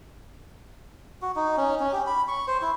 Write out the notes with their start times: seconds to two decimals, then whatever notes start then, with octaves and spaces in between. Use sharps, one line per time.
1.22 F#4
1.36 D#4
1.58 C#4
1.80 C#4
1.93 G4
2.07 B5
2.28 C#6
2.48 C5
2.62 E4